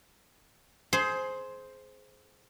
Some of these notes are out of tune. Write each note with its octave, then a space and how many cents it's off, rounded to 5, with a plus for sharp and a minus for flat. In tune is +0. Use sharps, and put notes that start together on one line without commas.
G#4 +25 C5 +0